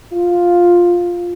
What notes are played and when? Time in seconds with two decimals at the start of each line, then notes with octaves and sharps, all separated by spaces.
0.12 F4